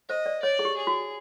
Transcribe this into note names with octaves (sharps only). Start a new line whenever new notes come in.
C5 D#5
D5
C#5 D5
G#4
G4
G#4
F#4